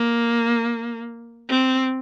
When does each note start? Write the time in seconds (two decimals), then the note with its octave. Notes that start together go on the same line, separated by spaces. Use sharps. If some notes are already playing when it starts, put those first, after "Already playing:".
Already playing: A#3
1.49 C4